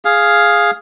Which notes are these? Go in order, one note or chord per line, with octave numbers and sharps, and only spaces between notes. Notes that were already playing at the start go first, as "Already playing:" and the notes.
G#4 F5